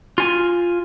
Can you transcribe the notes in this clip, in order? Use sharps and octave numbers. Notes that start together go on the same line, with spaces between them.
F4 G#5